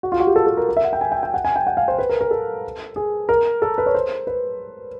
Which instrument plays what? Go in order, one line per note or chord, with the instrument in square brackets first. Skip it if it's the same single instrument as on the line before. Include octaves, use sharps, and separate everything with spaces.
[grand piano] F#4
F4
F#4
G4
A4
A4
A#4
A#4
E5
F#5
G5
G#5
G5
G5
F#5
G#5
G5
F#5
F5
C5
B4
A#4
A#4
A4
G#4
A#4
A4
B4
C#5
C5
B4